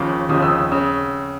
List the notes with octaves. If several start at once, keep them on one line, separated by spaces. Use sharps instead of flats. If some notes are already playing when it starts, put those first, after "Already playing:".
Already playing: D#2 C#3 F3 D6
D#2 C#3 F3 D#6
E6
C#3